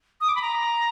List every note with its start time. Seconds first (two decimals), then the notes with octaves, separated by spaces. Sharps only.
0.21 D#6
0.28 D6
0.36 B5
0.42 A#5